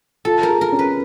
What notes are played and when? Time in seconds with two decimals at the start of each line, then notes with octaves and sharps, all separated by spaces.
0.25 F4 A4
0.43 A#4
0.49 G#4
0.61 A#4
0.72 C#4
0.79 B4